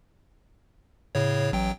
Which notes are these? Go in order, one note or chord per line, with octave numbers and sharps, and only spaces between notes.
A2 C#3 C#5
A1 F#3 G5